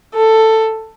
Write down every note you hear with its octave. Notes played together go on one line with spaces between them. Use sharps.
A4